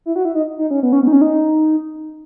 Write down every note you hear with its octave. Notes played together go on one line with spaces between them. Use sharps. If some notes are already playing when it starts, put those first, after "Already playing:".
E4
F#4
E4
D#4
D#4
C#4
B3
C#4
B3
D#4
C#4
D#4